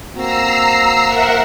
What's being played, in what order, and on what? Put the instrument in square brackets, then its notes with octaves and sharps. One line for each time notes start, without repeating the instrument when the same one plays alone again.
[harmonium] A#3 C4 F#4 [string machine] A#5 E6 C7
[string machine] A#4 E5 F#5